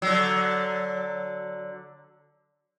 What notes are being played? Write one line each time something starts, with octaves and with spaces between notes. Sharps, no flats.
D3 F#3